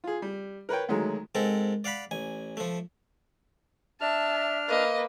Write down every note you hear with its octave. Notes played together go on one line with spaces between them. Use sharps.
F4 G#4
G3
A#4 B4 C#5 G5
D2 D#3 F#3 G#3 A3
G#2 C4 A4 A#4
D5 F5 F#5 B5
A1 G#5
F3 A3
D4 E5 A5 F6
A#3 B4 D#5